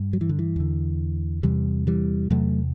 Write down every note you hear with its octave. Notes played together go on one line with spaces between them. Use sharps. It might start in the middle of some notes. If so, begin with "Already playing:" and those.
Already playing: G2
F#3
E3
D3
E3
E2 D3
E2 C3 E3 G3
E3 G3
E2 C3 F#3 A3